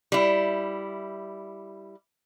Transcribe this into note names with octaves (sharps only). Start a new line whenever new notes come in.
G3 E4